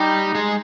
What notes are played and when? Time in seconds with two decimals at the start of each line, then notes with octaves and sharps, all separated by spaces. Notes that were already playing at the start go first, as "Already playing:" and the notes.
Already playing: G3 D#4 G4
0.35 G#3 G#4